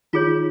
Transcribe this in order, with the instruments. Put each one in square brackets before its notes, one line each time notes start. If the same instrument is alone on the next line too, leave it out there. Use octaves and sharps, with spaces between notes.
[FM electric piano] D#3 D#4 [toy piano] F4 G#4 C#5